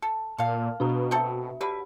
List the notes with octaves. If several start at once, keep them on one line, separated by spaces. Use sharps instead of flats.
A4
A#2 A4 F5
B2 D4 F#4 A#5
C4 F#4 A4 E5
D3 G4 B4 B5